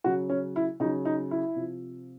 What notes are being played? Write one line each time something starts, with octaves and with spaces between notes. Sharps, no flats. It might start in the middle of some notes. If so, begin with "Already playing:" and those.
C#3 F#3 F#4
C#4
E4
C#3 F#3 D#4
D#4
E4
C3 F3